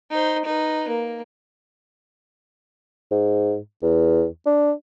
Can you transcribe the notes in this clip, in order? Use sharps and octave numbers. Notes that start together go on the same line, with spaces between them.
D#4 C5
D#4 B4
A#3
G#2
E2
D4